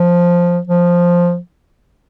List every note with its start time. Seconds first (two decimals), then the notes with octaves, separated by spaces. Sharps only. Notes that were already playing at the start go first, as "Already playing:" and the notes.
Already playing: F3
0.67 F3